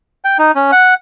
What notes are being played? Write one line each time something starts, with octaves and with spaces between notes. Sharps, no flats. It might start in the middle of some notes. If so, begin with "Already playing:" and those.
G5
D#4
C#4
F#5